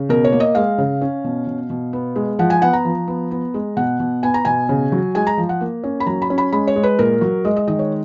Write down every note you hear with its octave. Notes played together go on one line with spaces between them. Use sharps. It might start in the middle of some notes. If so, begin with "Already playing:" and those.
Already playing: C#3
B2 A#4
C#5
A#3
D#5
G#3 F5
C#3
C#4
B2
B2
B2
B3
G#3
F3 F#5
G#5
B3 F#5
A#5
F3
B3
B3
G#3
B2 F#5
B2
B3 G#5
A#5
B2 G#5
C#3
F#3
G#3 G#5
A#5
F3
F#5
A#3
C#4
B5
F#3 A#5
B5
C#4
B5
G#3 B5
C#5
G#3
B4
A#2 A#4
F#3
G#3 D#5
D#5
D#3 D#5
C#5